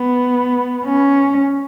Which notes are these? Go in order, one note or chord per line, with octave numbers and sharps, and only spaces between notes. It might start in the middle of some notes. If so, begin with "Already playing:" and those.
Already playing: B3
C#4